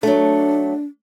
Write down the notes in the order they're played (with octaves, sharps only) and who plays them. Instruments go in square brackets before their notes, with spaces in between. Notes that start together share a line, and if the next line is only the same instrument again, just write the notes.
[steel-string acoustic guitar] F#3 A3 [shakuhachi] D4